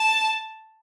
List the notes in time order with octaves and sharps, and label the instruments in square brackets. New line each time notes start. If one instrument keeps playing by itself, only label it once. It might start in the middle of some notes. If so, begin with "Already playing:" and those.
Already playing: [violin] A5